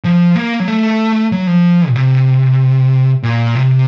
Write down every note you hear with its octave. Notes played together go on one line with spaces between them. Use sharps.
F3
A#3
F#3
A3
F#3
F3
A#2
C3
A#2
C3